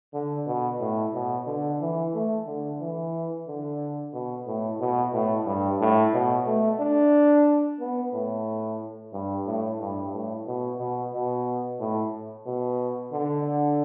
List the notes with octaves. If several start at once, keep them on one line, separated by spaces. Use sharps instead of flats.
D3
B2
A2
B2
D3
E3
A3
D3
E3
D3
B2
A2
B2
A2
G2
A2
B2
A3
D4
B3
A2
G2
A2
G2
A2
B2
B2
B2
A2
B2
D3